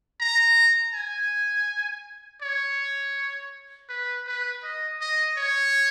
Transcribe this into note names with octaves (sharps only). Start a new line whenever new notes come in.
A#5
G#5
C#5
B4
B4
D#5
D#5
C#5